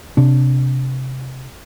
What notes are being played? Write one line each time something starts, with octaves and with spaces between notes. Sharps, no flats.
C3 D4